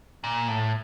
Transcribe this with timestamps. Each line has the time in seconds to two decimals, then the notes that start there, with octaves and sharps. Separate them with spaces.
0.24 A#2
0.48 A2